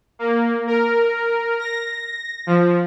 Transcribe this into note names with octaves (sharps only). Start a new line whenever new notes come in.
A#3
A#4
A#6
F3